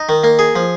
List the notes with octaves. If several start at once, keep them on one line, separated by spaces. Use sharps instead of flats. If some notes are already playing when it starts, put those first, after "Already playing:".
Already playing: D#4
D#3
A#3
G#4
F3